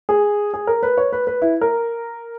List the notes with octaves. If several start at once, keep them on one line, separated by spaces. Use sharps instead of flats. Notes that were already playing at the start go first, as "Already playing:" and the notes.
G#4
G#4
A#4
B4
C#5
B4
B4
E4
A#4